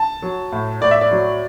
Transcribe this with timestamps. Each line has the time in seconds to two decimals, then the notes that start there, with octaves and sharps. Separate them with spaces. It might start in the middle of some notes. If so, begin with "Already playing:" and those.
Already playing: A5
0.22 F#3
0.52 A2
0.81 A2 D5
0.91 E5
1.01 D5
1.11 F#3